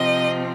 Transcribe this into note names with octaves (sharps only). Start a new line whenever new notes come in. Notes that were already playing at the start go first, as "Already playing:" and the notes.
Already playing: C3 F3 C4 D#5